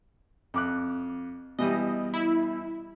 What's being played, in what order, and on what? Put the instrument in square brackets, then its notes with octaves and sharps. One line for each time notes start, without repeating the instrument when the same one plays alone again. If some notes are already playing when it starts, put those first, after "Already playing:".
[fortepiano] F2 D6 F#6
[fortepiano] B2 E3 G3 [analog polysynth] D#5
[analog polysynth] E4